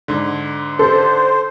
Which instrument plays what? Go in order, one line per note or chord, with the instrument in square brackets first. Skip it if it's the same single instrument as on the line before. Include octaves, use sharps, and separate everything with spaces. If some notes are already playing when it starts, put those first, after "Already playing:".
[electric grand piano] G#2 D3
[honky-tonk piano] A4 [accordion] C5